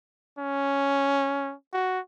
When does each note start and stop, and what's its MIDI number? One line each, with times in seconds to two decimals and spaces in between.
0.39 1.54 61
1.73 2.00 66